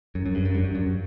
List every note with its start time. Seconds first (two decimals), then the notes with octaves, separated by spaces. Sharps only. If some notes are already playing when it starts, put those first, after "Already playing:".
0.15 F#2
0.26 F#2
0.35 G2
0.45 F#2
0.55 G2
0.64 F#2
0.75 F#2